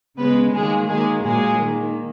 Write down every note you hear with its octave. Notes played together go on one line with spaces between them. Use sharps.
C#3 G#3 B3 B4
D#3 F#3 G#3 A#3 G#4
D#3 F#3 G#3 A#3 G#4
A#2 F#3 G#3 A#3 G#4
D#3 A#3